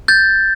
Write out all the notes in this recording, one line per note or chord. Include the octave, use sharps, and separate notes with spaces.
G6 A6